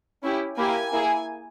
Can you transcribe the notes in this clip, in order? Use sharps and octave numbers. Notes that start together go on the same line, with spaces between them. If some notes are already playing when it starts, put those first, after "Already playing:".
C#4 E4 G4
A#3 E4 G4 G#5
A#3 E4 G#4